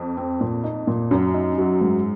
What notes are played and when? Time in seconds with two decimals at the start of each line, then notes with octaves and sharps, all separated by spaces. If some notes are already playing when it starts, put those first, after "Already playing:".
Already playing: F2
0.17 C4
0.41 A#2
0.64 D#4
0.87 A#2
1.11 F#2 F#3
1.34 D#4
1.58 F#3
1.81 G#2